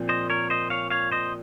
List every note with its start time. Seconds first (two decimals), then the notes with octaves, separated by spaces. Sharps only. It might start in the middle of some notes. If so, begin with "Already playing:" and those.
Already playing: A#2 F3 C4
0.09 C5 D#5
0.30 A#4 C#5
0.50 C5 D#5
0.70 C#5 F5
0.90 C#5 F5
1.12 C5 D#5